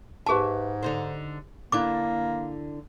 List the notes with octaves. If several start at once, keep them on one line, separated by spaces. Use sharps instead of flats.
G#2 G4 G#4 B4 E5 A5
D3 D#4 C5
D3 A#3 D4 E4 D6